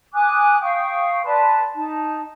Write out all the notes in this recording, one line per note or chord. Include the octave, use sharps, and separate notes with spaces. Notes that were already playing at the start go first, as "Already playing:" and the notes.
G#5 D6 D#6 F#6
F5 G5 C#6 D#6
B4 D5 A5 C6
D#4 A5